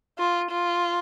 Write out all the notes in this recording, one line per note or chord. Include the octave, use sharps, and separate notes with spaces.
F4
F4